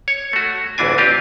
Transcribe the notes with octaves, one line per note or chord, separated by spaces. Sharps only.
C#5
A3 F#4
A1 D2 E3 D4 G#5
C4 F4 G4